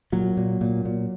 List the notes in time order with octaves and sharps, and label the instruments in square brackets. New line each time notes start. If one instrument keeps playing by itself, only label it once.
[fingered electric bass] A#2 F#3
A#2
A#2
A#2